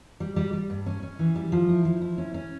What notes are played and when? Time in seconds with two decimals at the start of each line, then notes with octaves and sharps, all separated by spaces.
0.20 G3
0.36 G3
0.53 G3
0.70 G2
0.86 C#4
1.03 C#4
1.19 E3
1.36 G3
1.52 F3
1.69 E4
1.85 F3
2.02 E4
2.18 C#4
2.34 C#4